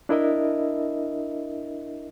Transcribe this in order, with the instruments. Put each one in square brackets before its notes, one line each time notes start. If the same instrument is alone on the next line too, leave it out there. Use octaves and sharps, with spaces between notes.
[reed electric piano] D4 E4 A#4 D#5 E5